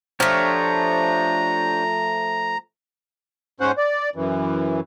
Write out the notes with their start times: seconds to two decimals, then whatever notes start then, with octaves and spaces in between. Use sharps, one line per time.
0.20 F3 A3 D4 G4 C#5 A#5
3.60 G#2 C#4 C5 F#5
3.77 D5
4.16 F#2 E3